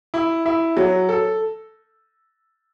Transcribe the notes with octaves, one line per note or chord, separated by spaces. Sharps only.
E4
E4
F#3
A4